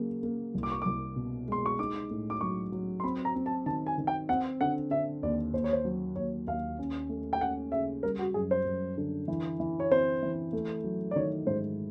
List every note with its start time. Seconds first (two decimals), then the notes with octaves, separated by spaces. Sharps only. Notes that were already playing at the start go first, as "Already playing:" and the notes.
Already playing: C#3 F#3 A#3
0.23 A#3
0.54 C2
0.63 D6
0.72 C#6
0.82 C2 D6
1.16 B2
1.48 G#3 C6
1.66 C#6
1.79 D#4 D6
2.11 A2
2.30 D6
2.41 F#3 C#6
2.72 F#3
3.00 C6
3.03 C4 B5
3.25 A#5
3.35 C4
3.46 A5
3.66 D#3 A5
3.87 G#5
3.98 D#3
4.07 G5
4.29 C4 F#5
4.61 D3 F#5
4.91 D3 E5
5.23 D#2 D5
5.53 D#2 C5
5.64 C#5
5.73 C5
5.85 F#3
6.16 D#2 C#5
6.47 D#2 F5
6.79 C#4
7.09 A3
7.33 G5
7.41 C#4 F#5
7.72 C#3 E5
8.03 G3 A#4
8.19 F#4
8.34 F#2 G#4
8.51 C5
8.65 F#2
8.98 D3
9.28 E3
9.60 E3
9.80 C#5
9.91 C4 C5
10.22 E3
10.53 A3
10.84 F#3
11.11 D5
11.16 D#3 C#5
11.47 G#2 C5